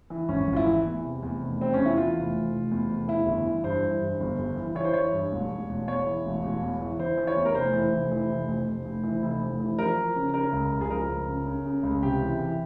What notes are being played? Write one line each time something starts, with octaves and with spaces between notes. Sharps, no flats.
E3
G#1 C#4
G#1
F4
E4
E3
E2
C3
E2
F1
C3 C4
E2 C#4
E4
E3 F4
F1
F1
F1
E2
F1
E3 E4
G1
E3
G2 C5
E3
G2
G1
G1
E3
E3 C#5
C5
E3 C#5
G2
E1
E1
E1
E2 C#5
E3
E1
E1
E2
E3
E3 C5
E3
C#5
E2
A#4
F1 C5
E3
F1
E3
F1
F1
F1
F1
E3
F1
F1
E3
F3 A#4
F3
C#3
C#3 A#4
C#2
C#2
G#4
F3 A#4
C#2
C#3
C#3
C#3
C#2
C3 G4
E3
E3